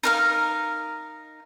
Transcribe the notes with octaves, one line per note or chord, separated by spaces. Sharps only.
D#4 A#4 F5